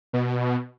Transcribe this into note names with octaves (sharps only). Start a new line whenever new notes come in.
B2